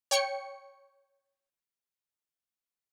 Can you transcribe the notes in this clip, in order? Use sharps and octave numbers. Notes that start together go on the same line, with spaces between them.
C#5 G5 C#6 C#7